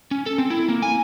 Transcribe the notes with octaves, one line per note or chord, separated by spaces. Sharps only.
C#4
A4
C4
E4
A#3
G#5